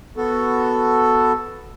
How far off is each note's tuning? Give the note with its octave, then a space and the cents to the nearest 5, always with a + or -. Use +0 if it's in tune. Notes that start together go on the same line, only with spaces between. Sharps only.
B3 +0 F#4 +0 A4 +0